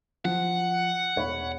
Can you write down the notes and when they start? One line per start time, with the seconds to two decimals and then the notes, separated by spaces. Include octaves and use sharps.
0.25 F3 F#5
1.16 E1 C#5 B5